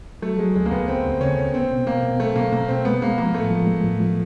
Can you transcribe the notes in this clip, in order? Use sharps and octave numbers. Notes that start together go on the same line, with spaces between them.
F#3 A3
F#3 G#3
D2 G#3
A#3
D2 B3
D2 C4
D2
C#3 C#4
D2
B3 C4
B2
A#3 B3
B2
F#3 A3
B2 A#3
B2 A#3
B2 C4
G#3 B3
G#3 A#3
F3 A#3
A2 A3
F3
G#3
A2
F3